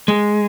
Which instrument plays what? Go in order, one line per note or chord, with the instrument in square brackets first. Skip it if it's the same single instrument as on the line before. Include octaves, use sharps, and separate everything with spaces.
[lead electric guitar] G#3